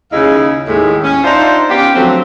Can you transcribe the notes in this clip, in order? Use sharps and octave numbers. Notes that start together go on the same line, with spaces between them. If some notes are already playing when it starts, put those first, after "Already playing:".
D#2 C#3 D#4 E4 G#4 F5
D#2 A2 G#3
C#4
D4 D#4 F4 C5 D5 E5
B3 C#4 F4 G4
D3 F3 F#3 A3 C4